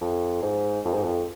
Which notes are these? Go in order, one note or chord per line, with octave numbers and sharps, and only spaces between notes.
F2
G#2
F2
G#2
F2